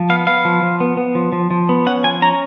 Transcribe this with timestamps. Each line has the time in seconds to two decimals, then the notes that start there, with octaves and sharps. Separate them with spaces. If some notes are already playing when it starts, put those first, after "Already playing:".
Already playing: F3
0.10 B3 F5
0.27 B3 F5
0.45 F3
0.63 F3
0.80 B3
0.97 B3
1.15 F3
1.32 F3
1.51 F3
1.69 B3
1.86 C#4 F#5
2.04 F3 G#5
2.22 C#4 A#5